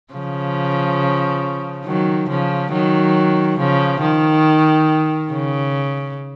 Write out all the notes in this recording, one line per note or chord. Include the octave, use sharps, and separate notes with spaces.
C#3 F3
D#3 F#3
C#3 F3
D#3 F#3
C#3 F3
D#3
C#3